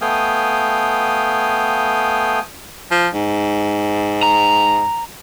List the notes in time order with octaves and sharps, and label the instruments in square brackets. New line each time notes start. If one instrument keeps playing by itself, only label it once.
[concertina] A3 B3 F5 G5 G#5 D#6
[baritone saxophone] F3
G#2
[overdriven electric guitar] A#5